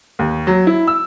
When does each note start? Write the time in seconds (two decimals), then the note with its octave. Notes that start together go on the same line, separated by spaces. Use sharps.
0.19 D#2
0.47 F#3
0.67 E4
0.87 E6